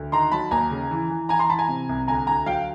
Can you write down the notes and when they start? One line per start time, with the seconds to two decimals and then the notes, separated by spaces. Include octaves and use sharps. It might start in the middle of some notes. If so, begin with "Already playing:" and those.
Already playing: D2
0.12 D#3 A#5 C6
0.32 F#3 A5 B5
0.51 D#2 G#5 A#5
0.71 C#3
0.91 E3
1.10 E3
1.29 E3 G#5 A#5
1.39 A#5 C6
1.49 E3 A5 B5
1.59 G#5 A#5
1.68 C3
1.89 C2
2.08 D2 G#5 A#5
2.27 D2 G#5 A#5
2.46 F#3 F5 G5